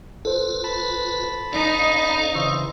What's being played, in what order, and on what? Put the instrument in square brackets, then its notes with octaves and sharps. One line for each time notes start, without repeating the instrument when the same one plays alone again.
[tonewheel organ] F4 B4 [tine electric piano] A4 C5
[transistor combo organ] A5 B5
[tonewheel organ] C#4 D5 F5 [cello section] D#4
[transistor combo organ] C#3 E3 C5 [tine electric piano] C#6 D#6 E6